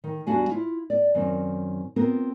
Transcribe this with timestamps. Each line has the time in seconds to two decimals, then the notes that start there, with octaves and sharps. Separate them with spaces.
0.04 D#3
0.27 E2 G3 D4 F#4 F5 G#5
0.51 E4 F4
0.90 D5
1.15 F#2 D#3 C4
1.96 B3 C4 F4 A#4